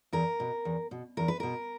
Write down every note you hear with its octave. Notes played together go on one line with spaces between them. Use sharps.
E2 A#4
B2
E2
B2
E2 A#4
B4
B2 A#4